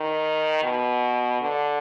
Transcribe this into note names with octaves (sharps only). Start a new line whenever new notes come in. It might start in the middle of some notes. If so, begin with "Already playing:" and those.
Already playing: D#3
B2
D3